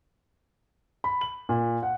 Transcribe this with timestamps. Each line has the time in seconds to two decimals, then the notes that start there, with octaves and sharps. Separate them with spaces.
1.04 B5
1.21 F#7
1.49 A#2
1.83 F#5